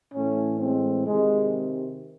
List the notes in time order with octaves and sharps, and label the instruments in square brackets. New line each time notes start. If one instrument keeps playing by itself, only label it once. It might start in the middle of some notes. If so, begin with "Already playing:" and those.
[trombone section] A2 E3 A3 C#4
G#3 C4
C3 D#3 G#3